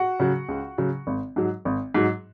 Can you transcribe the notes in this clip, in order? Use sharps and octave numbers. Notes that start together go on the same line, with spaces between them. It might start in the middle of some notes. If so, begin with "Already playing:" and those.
Already playing: F#4 F#5
C#3 F#3
C#2
C#3 F#3
G#1
G#2 F#3
G#1
G#2 F#3